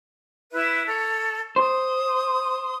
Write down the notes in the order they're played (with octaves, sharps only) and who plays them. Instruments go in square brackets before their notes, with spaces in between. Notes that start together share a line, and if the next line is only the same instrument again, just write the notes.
[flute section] E4 B4 E5
A4 C#5
[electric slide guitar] C5 [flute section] D#6